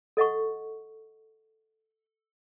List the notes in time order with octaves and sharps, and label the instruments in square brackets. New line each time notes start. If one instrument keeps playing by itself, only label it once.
[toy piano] A4 D#5 F#5 C#6